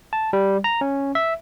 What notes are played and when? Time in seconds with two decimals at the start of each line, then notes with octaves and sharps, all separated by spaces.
0.13 A5
0.33 G3
0.64 A#5
0.81 C#4
1.15 E5